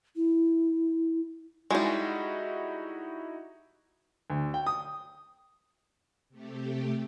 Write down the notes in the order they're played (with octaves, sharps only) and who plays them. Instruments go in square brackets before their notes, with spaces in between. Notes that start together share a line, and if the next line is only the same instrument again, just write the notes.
[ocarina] E4
[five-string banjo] G3 G#3 [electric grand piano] D#4 E4 F#4
[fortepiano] D2
G5
D#6
[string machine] C3 A3 G4